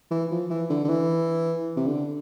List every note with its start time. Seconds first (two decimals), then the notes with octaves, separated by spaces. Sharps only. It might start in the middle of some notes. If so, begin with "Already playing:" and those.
0.11 E3
0.31 F3
0.50 E3
0.70 D3
0.84 D3
0.89 E3
1.77 C3
1.87 D3